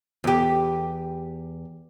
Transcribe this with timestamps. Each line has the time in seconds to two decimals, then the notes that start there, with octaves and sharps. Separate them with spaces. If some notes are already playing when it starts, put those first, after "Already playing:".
0.24 E2 G4